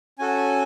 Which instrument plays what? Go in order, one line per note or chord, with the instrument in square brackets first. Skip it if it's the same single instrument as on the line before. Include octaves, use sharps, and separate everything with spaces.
[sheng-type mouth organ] C#4 F#4 A4 G#5